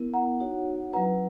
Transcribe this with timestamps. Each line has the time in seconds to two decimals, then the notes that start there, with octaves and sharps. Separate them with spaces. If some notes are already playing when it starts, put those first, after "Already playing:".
Already playing: B3 E4 A#4
0.13 F#5 A#5
0.40 D#4 F#4 C#5 F#5
0.93 F#3 C#4 E4 B4 F#5 A#5